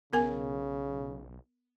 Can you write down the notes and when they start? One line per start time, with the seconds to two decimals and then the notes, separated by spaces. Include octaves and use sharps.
0.13 B1 C#3 B3 A#4 G#5